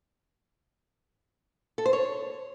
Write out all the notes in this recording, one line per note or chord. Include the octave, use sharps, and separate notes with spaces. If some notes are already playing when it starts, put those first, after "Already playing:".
A4
C5
C#5